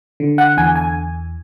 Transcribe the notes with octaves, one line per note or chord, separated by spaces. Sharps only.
D3
F#5
E2 G#5
G#5